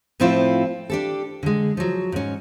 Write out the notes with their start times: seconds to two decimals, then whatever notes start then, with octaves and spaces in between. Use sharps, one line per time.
0.20 A2 F3 A3 C4 E4 F4
0.90 D4 G4 A4
1.43 D3 G#3
1.77 F3 F#3
2.12 G#2 C#4